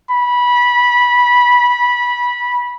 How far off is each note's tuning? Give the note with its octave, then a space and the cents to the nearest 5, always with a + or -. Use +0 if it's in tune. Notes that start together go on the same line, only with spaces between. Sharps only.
B5 -20